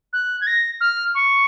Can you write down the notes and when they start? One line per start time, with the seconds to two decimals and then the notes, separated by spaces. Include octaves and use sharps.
0.13 F#6
0.41 G#6
0.47 A#6
0.81 F6
1.15 C#6